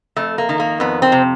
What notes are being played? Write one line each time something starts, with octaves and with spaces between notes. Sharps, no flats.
F2 A3
A#3
D#3
A#3
F2 B3
C4
C3